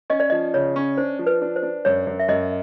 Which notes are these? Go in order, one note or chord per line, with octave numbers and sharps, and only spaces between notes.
C#4 D#5
D5
F3 D#5
C#3 C#5
C#4
D4 C5
F3
B4
D4
C5
D4
F#2 C#5
F#2
E5
F#2 D#5